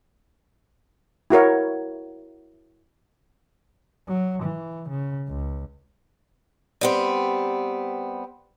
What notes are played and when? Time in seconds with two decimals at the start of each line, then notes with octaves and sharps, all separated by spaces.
1.30 E4 F#4 A#4 C#5
4.08 F#3
4.43 E3
4.89 C#3
5.28 C#2
6.81 G3 B3 C4